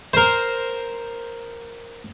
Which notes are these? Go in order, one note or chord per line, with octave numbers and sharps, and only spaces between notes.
A#4 C5